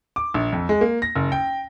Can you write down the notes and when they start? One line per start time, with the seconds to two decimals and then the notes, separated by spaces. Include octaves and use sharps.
0.16 D6
0.34 A#1
0.53 F2
0.69 G#3
0.81 A#3
1.02 A#6
1.16 F#1
1.32 G5